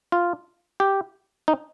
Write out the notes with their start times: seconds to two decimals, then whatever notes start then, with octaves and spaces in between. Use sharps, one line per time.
0.12 F4
0.80 G4
1.48 D#4